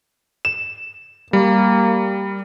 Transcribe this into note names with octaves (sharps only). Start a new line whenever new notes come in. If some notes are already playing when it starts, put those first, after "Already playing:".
E7
G3 A#3